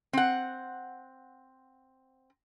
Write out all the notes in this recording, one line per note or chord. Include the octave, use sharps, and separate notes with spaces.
C4 F#5